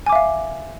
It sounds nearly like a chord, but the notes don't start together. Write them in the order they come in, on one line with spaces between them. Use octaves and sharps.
G#5 D6 E5 F5